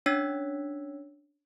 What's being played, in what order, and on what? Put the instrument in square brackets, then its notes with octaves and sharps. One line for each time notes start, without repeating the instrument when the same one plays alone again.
[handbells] C#4 D4 C#5 E6 G#6 B6